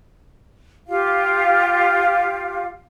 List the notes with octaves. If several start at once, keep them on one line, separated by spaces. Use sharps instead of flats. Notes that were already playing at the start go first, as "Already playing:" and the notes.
F4 G4 F5